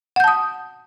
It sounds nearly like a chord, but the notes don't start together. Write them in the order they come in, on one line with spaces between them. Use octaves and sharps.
F#5 G6 A5 D#6